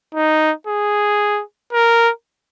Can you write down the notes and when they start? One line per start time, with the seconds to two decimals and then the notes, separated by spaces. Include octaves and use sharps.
0.14 D#4
0.67 G#4
1.73 A#4